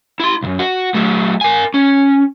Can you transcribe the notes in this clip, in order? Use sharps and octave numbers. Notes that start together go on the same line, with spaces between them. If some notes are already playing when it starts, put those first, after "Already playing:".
E4 C6
B1 F#2
F#4
F#3 A3
A#4 G#5
C#4